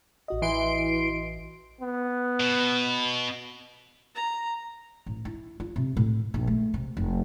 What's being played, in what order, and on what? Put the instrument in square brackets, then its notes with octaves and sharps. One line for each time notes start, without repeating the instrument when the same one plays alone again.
[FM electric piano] A1 F#4 D#5
[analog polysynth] E3 C6 D7
[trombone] B3
[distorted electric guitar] B2
[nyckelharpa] A#5
[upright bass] A1
E4
F4
C3
A2
A#1
A3
C3
F1